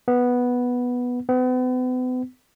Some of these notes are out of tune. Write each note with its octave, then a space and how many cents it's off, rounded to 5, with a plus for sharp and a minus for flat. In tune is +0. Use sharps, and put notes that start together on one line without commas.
B3 -5
B3 +40